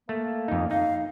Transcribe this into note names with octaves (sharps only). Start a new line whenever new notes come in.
A3 A#3
F2 D#4
D#4 F5